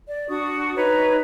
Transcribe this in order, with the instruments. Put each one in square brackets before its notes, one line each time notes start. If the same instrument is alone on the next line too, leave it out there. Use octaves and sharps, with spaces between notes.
[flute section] D5
D4 F#4 C#6 D#6
D#4 B4 C#5 A#5